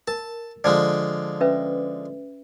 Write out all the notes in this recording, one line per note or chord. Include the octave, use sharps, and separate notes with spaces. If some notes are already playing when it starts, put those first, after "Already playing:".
A#4 A5
D3 F3 G#3 D5
C#4 B4 E5